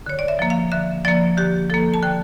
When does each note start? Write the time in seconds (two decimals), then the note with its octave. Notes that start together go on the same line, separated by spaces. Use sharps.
0.06 D3 C#5
0.19 D5
0.28 E5
0.39 F3 A#3
0.50 F5
0.72 D3 E5
1.05 F3 A#3 D5
1.37 D3 G4
1.70 F3 A#3 A4
1.94 A5
2.02 D3 G5